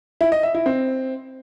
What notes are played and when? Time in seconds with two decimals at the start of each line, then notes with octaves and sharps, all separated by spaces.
0.21 E4
0.32 D#5
0.43 E5
0.54 E4
0.66 C4